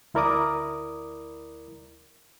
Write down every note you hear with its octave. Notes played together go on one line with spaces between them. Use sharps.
D2 E4 A#4 D5 D6 D#6